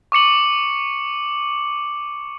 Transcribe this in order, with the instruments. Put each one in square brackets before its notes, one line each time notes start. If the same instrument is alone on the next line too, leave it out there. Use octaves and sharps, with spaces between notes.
[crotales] C#6 D6 C#7 F#7